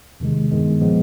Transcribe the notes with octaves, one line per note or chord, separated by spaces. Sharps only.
E2 C3 D#3 G#3
G2 D#3 G#3 B3
A#2 F3 G#3 B3